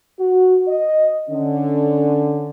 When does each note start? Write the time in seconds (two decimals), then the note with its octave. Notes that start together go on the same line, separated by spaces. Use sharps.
0.19 F#4
0.68 D#5
1.30 D3 C#4